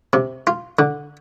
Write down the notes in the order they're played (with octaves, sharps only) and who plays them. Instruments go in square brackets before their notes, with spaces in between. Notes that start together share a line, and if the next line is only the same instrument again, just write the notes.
[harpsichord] C3
F4
D3